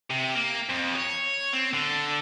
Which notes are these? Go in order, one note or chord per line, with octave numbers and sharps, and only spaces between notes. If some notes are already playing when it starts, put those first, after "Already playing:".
C3
A#3
F2
C#5
C4
D3